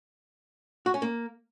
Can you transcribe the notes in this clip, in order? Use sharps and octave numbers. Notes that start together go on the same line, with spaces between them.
F#4
C#4
A#3